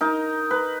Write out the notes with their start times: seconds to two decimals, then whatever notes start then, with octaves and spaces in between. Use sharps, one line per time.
0.01 D#4 A#4
0.51 B4